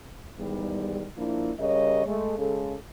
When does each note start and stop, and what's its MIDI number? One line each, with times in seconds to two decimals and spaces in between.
0.39 1.06 40
0.39 1.06 44
0.39 1.06 51
0.39 1.06 55
1.17 1.51 53
1.17 1.51 58
1.17 1.51 62
1.17 1.51 64
1.59 2.05 49
1.59 2.05 55
1.59 2.05 70
1.59 2.05 73
1.59 2.05 75
2.07 2.34 56
2.07 2.34 57
2.39 2.76 49
2.39 2.76 56
2.39 2.76 69